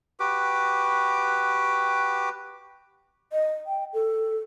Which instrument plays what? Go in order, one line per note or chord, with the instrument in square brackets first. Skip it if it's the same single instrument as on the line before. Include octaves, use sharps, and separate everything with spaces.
[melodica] F#4 G4 B4 D6
[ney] D#5
G5
A4